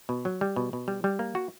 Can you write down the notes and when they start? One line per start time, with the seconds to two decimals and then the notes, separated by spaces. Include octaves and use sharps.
0.09 B2
0.25 F#3
0.41 G3
0.56 B2
0.73 B2
0.88 G3
1.04 G3
1.19 A#3
1.35 F#4